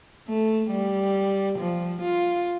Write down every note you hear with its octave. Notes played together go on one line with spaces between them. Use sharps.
A3
G3
F3
F4